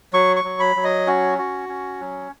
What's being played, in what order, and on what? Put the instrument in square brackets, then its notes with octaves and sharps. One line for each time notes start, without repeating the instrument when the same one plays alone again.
[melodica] F#3 C#6
C#6
F#3
B5
F#3
D#5
C#4 F#4
F#4
C#4
F#3